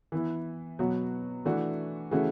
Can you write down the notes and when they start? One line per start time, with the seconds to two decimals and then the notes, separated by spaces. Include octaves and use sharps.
0.12 E3 B3 E4
0.79 B2 F#3 B3 F#4
1.45 E3 A3 D4 F#4
2.11 C#3 E3 A3 C#4 F#4